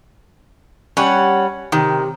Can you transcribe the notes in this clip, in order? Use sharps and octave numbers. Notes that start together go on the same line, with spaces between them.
G3 C#4 C#5 F#5
C3 D#3